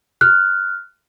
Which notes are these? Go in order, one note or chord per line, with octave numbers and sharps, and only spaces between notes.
F6 F#6